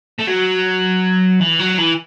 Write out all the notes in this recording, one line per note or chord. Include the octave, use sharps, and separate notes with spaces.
A3
F#3
E3
F#3
E3